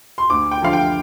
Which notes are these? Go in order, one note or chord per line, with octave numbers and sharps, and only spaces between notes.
C6
D2 D6
G5
D3 F3 F5
G5